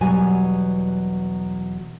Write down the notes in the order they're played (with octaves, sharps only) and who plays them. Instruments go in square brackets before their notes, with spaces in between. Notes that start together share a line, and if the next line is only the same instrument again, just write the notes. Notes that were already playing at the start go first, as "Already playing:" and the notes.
[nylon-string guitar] E2 B2 F#3 G3 G#5